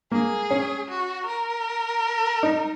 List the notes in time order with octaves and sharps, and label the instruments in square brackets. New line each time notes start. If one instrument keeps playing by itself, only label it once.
[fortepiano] A#3 [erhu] G#4
[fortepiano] C#4
[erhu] F#4
A#4
[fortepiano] D#4